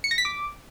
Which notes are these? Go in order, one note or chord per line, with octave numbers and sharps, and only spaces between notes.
C#7
A#6
B6
D6